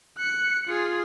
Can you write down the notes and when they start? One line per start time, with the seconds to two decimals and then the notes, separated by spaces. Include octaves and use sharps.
0.18 F#6 C#7
0.68 F4 G#4